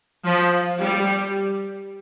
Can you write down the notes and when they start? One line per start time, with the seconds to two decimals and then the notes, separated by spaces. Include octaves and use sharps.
0.25 F3
0.80 G3